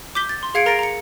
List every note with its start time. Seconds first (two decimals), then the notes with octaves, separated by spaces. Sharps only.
0.15 D6 G6 B6 G7
0.29 A6
0.43 C6
0.54 G#4 F5 G#6 C#7 D7
0.66 A#4 A#5 A6 A#6 C7 D7
0.79 A#5 C#7